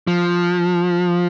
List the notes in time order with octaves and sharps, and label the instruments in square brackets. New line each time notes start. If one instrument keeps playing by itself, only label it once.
[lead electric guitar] F3